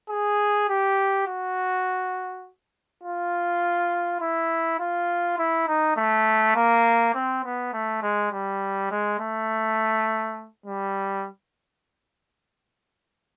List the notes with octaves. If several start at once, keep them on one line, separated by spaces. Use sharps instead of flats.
G#4
G4
F#4
F4
E4
F4
E4
D#4
A3
A#3
C4
B3
A3
G#3
G3
G#3
A3
G3